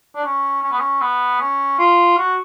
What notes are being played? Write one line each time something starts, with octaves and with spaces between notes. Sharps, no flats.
D4
C#4
C#4
B3
C#4
B3
C#4
F4
F#4